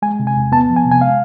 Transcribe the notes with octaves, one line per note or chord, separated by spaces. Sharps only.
G#3 G#5
C3
G#5
E2
B3 A5
F3
G#5
C3
G#5
G#3 F5